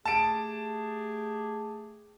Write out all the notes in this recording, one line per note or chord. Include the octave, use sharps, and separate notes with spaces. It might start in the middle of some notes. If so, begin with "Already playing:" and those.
A3 G4 G#4 A5 D7